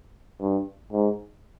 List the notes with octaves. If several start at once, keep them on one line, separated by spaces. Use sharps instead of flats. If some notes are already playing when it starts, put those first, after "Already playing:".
G2
G#2